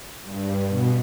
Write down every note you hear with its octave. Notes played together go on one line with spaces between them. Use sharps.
G2
B2